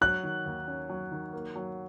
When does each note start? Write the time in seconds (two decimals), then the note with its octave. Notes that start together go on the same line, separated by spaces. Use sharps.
0.01 F#3 F#6
0.23 D#3
0.46 D#2
0.68 C#4
0.89 F#3
1.12 D#3
1.33 A#3
1.56 F#3